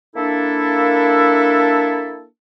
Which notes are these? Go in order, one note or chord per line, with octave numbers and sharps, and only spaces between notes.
A#3 D4 E4 A4